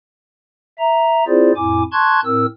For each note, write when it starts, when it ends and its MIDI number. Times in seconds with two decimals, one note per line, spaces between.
0.79 1.24 76
0.79 1.24 82
1.28 1.52 60
1.28 1.52 64
1.28 1.52 65
1.28 1.52 68
1.28 1.52 72
1.28 1.52 74
1.56 1.83 41
1.56 1.83 45
1.56 1.83 64
1.56 1.83 80
1.56 1.83 86
1.92 2.20 81
1.92 2.20 84
1.92 2.20 85
1.92 2.20 90
1.92 2.20 92
2.25 2.46 45
2.25 2.46 60
2.25 2.46 70
2.25 2.46 88